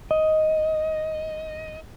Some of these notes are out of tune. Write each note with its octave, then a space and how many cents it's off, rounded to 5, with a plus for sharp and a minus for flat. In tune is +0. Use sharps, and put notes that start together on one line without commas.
D#5 +10